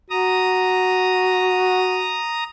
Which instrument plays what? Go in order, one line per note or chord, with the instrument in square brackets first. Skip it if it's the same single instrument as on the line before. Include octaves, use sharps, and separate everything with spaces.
[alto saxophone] F#4 [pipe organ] A#5 D#6